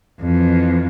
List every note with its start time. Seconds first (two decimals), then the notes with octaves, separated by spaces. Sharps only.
0.21 F2 E3